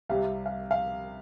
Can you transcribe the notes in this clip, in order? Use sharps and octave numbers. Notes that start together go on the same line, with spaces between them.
C2 C3 G3 F5
F5
F5